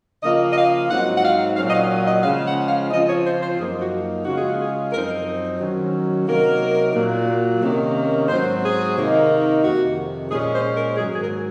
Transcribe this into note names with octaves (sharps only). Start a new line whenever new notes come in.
C#3 F3 A#3 F4 D#5
D#5
F5
G#2 F#3 C4 D#4 F#5
F#5
F5
A#2 F#3 C#4 F5
D#5
F5
D#5
C#3 F3 G#3 C#4 F4 F5
F#5
F5
C#3 F3 C4 F4 D#5
C#5
C5
C5
F#2 F3 A#3 D#4 G#4
F#4
C#3 G#3 C#4 F4 F#4
G#4
F#4
G#4
F#2 F3 C4 D#4 A#4
D#3 F#3 C#4
C3 F#3 A#3 D#4 A#4
A#2 F#3 A#3
C3 D#3 A#3 C#4
G#2 F#3 C4 C5
G#4
C3 D#3 A#3 D#4
F2 C3 D#3 F#4
A#2 G#3 C#4 G#4
C5
A#4
G#2 D#3 F#3 G#4
G#4
A#4